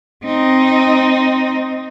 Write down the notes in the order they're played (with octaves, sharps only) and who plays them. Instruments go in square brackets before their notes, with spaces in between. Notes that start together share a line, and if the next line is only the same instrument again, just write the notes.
[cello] C4 D#4